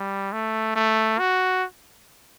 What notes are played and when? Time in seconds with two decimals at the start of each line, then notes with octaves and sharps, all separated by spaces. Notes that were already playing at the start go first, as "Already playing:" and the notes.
Already playing: G3
0.32 A3
0.76 A3
1.19 F#4